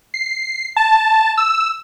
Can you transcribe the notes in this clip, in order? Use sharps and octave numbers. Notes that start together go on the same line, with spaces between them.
C7
A5
E6